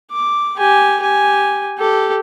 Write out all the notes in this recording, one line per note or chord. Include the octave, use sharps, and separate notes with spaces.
D6
G4 G#5
G4 G#5
G4 A4